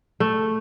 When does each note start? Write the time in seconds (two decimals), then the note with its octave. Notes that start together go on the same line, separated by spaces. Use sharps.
0.20 A3